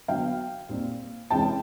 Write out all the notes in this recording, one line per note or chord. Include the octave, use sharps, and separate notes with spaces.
D3 F#3 B3 F5 G5
A#2 G3 C4 D#4
C3 E3 G#3 C#4 G5 A5